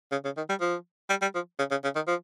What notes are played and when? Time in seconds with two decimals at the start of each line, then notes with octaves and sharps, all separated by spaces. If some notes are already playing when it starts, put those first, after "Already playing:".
0.11 C#3
0.25 C#3
0.37 D#3
0.49 G3
0.60 F3
1.10 G3
1.22 G3
1.35 F3
1.59 C#3
1.71 C#3
1.84 C#3
1.95 D#3
2.07 F3